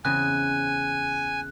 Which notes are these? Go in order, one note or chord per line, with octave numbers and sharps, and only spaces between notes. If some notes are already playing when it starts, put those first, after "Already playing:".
E2 C#3 C4 G#5 F#6